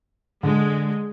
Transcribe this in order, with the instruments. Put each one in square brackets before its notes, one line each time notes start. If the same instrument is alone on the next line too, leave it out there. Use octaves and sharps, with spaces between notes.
[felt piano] D3 [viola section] G#3